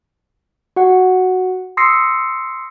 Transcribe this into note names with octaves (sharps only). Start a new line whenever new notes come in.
F#4 F#5
C6 D#6 E6 A#6 C7 C#7